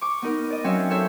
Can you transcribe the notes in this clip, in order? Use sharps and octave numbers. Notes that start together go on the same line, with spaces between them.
C#6 D6
B3 D#4 A#4
D5 D#5
F#3 C4 C#4 C#5 E5 F5
A4 C5 C#5 E5